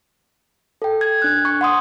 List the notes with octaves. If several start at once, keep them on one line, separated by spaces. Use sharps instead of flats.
A4 G5
G#6
D4 F#6
C#6
F#5 C6 D#6